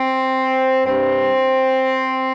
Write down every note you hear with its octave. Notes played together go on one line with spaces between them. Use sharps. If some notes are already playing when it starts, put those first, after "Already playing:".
Already playing: C4
G2 G3 C4